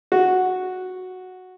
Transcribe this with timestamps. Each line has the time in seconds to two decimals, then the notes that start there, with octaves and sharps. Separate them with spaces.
0.12 F#4